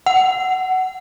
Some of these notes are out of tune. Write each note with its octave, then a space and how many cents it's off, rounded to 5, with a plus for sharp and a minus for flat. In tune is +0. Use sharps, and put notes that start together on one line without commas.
F#5 +15